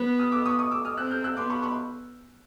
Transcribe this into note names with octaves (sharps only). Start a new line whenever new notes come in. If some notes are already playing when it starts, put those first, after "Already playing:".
Already playing: B3
D#6 F6
D6 E6
C#6 D#6
C#6 D#6
D6 E6
D#6 F6
C4 E6 F#6
F6 G6
E6 F#6
B3 C6 D6
B5 C#6
B5 C#6